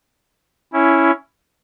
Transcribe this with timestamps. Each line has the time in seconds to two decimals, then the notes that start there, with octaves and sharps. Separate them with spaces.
0.73 C#4 E4